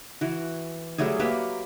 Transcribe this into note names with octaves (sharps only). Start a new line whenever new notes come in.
E3 F#4
F#3 G3 A3 G#4
F#3 A#3 G4 B4